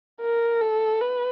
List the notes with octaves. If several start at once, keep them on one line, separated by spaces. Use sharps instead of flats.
A#4
A4
B4